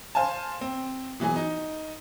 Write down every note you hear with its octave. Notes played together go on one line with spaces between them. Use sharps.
C5 F5 G#5 A5
C4
B2 E3 F#3 G#4
D#4